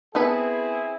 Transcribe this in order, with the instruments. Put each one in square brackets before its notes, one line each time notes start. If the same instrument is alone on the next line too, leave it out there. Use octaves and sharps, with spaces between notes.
[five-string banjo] B3 A4 B4 [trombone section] C4 E4 G#4